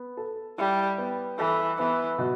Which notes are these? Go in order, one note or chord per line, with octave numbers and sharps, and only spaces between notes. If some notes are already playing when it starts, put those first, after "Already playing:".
Already playing: B3
A4
G3 E4
B3
E3 A4
E3 B3
B2